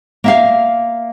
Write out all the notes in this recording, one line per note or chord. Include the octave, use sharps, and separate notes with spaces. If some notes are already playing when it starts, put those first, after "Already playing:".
A#3 E5 F5